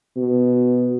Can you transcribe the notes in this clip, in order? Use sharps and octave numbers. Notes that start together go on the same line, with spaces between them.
B2